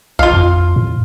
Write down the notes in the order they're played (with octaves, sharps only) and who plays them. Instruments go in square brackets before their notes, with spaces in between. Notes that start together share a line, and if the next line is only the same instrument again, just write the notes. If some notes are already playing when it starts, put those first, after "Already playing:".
[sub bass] A#1 [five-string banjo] F4 F5
[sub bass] F2
A2